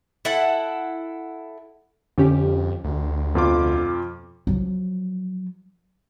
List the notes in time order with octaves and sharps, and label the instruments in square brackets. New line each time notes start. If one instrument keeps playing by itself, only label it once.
[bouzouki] E4 A4 F#5
[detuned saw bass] F2 [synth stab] D3 C#4 G4
[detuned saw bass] D2
[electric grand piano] F2 F4 D6 [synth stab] B2
[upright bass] F3 F#3